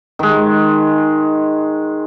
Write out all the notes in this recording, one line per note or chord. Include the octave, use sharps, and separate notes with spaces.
D#3 G#3